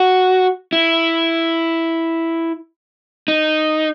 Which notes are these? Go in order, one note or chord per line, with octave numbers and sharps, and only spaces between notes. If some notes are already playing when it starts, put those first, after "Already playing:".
Already playing: F#4
E4
D#4